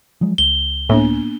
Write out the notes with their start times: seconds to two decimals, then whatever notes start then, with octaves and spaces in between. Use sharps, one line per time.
0.21 F3 F#3 G#3
0.38 C#2 G7
0.89 A2 A#3 B3 D4